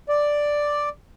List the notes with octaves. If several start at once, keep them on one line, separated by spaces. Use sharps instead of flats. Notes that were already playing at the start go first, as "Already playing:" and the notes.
D5